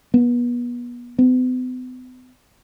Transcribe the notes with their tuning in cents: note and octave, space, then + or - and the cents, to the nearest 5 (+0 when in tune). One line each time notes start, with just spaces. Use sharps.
B3 -30
B3 +45